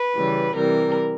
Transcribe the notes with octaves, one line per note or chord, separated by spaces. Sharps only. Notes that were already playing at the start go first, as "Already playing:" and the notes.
Already playing: B4
C#3 E3 G3
C3 E3 G3 A#4